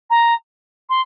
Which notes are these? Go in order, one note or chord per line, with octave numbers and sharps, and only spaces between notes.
A#5
C6